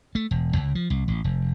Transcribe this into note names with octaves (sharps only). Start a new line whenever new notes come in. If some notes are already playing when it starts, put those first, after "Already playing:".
A3
E1
C#2
F3
C2
A1
F1